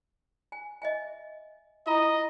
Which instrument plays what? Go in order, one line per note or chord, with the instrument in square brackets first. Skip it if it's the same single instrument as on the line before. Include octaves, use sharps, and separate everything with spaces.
[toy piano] G#5
D#5 E5 G#5
[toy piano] E4 F4 A#5 [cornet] D#5